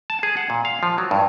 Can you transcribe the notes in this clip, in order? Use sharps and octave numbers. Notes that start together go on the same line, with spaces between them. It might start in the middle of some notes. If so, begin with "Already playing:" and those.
A5
G#4
F#5
A#2
F5
F3
F#3
G2